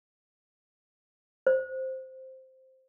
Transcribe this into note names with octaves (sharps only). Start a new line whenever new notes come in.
C5